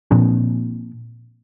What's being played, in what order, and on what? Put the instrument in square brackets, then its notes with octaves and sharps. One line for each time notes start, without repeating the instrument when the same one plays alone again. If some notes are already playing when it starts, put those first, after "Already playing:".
[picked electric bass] A#2 F3 C4 D4